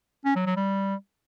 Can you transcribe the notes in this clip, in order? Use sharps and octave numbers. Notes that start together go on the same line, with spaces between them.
C#4
F#3
F#3
G3